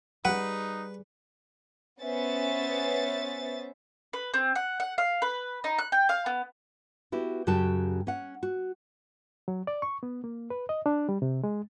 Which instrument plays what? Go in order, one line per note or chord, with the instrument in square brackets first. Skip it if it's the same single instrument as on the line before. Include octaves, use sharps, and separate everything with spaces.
[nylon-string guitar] G3 G#4 [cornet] D#4 [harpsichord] B4 [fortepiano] F#5
[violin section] B3 C#4 C5 E5 A6
[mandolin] B4
C4
F#5
F#5
F5
B4
D#4
F#6
G5
F5
B3
[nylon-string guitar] B3 E4 F#4 G4
F#2 C#3 F#4 G4 G5 A5
C#4 F#5
F#4
[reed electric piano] F#3
D5
C#6
B3
A#3
B4
D#5
D4
G3
C3
G#3